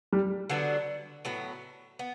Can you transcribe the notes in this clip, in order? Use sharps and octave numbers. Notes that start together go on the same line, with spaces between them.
G3
D3 F#3 B3 D4
A2 F#3 B3
B3